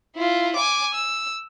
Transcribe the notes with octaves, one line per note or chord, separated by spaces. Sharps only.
E4 F4
G#5 D6
E6